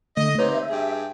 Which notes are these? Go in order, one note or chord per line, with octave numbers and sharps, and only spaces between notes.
D3 A3 D#5
C3 A#3 D#4 B4 C#5
E5
G2 G4 G#4